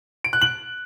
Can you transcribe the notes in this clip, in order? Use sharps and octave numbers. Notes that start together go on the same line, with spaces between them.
D7
F#6
F#7